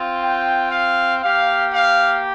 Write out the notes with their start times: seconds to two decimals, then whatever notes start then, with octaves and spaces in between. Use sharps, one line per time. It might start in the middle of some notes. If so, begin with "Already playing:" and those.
Already playing: C4 F4
0.21 G5
0.71 F5
1.22 A#3 G4 F5
1.73 F5